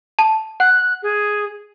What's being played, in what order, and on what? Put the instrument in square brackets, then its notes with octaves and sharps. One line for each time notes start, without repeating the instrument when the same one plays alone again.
[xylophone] A5
[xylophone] F#5 [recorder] F#6
[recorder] G#4